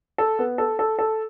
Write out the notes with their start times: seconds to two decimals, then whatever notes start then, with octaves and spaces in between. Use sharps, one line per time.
0.18 A4
0.39 B3
0.58 A4
0.79 A4
0.99 A4